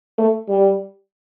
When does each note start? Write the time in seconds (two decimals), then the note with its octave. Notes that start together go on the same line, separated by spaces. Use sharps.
0.18 A3
0.49 G3